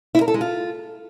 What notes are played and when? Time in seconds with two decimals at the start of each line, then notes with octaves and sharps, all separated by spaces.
0.15 E4
0.21 A#4
0.28 A4
0.34 G#3
0.41 F4